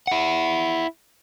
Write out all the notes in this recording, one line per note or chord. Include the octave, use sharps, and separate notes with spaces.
E4 F#5